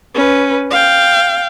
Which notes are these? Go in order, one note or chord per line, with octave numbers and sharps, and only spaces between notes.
C#4 B4
F5 G5